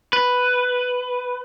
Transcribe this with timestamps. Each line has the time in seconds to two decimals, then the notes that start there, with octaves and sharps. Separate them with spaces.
0.13 B4